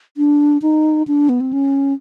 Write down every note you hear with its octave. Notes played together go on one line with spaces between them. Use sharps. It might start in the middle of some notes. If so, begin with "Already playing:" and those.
D4
D#4
D4
B3
C4
C#4